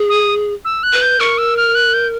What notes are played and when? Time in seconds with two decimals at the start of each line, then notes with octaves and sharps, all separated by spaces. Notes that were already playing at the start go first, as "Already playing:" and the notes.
Already playing: G#4
0.09 D#6
0.65 E6
0.83 F#6
0.93 B4
1.02 G6
1.20 A#4 C#6
1.38 E6
1.57 F6
1.75 F#6
1.94 G6